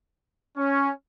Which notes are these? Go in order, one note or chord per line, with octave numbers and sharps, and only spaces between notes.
C#4